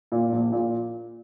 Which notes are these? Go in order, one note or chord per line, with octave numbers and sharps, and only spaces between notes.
A#2
A#1
A#2